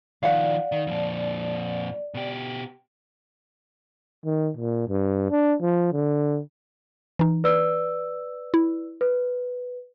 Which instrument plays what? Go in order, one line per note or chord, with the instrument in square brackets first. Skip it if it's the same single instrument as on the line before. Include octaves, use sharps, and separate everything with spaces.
[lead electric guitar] D#3 F3 [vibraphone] D5 [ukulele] F5 F#5
[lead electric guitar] D#3
F2 A#2
B2 G4
[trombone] D#3
A#2
G2
D4
F3
D3
[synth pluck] E3 D#4
[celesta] B4 D5 E6
[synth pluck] E4
[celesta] B4